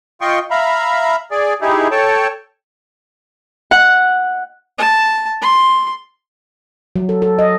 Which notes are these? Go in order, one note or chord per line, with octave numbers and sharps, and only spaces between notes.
F4 D#5 G5 C6 C#6
E5 F5 A#5 B5
G#4 D5
D#4 E4 G4 G#4
A4 C#5 G5 A5
F#5
A5
C6
F#3
A4
A4
D#5